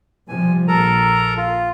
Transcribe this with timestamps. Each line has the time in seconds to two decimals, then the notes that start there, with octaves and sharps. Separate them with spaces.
0.28 C3 F3 G3 G#5
0.68 A#1 A4 A#4 A#5
1.37 F4